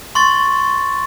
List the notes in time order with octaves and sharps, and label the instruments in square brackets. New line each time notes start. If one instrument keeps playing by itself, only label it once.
[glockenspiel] C6 C#6 A6